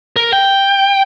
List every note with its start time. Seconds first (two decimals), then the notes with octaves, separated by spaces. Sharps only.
0.16 A#4
0.33 G5